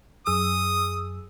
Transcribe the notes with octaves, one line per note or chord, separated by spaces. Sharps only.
F#2 G#4 D#6 E6